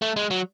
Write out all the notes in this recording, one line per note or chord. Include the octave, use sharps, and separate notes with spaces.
A3
G#3
F#3